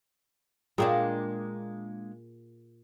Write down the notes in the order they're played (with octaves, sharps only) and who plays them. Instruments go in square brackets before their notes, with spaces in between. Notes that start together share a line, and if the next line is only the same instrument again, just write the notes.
[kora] A#2 G#4 G5 [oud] G#3 A#3 D4